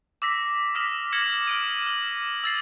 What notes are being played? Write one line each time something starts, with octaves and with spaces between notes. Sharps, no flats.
D6 E6 A#6 B6
D6 D#6 F6 A#6 B6 E7
D6 F6 G#6 A#6 C#7 F#7
F6 D7 D#7
F6 F#7
E6 A6 C7